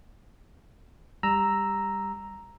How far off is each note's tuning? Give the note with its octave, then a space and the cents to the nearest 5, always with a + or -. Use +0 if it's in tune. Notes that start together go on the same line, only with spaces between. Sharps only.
G3 +15 A#5 +0 E6 +0